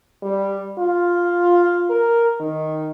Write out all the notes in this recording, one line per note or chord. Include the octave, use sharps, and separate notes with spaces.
G3
F4
A#4
D#3